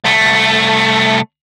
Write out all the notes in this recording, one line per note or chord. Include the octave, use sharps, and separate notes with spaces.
C2 A3